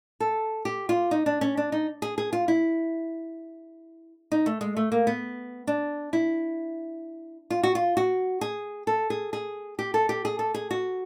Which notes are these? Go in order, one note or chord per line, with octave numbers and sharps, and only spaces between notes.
A4
G4
F4
D#4
D4
C#4
D4
D#4
G#4
G#4
F4
E4
D#4
A3
G#3
A3
A#3
B3
D4
E4
F4
F#4
F4
F#4
G#4
A4
G#4
G#4
G4
A4
G4
G#4
A4
G#4
F#4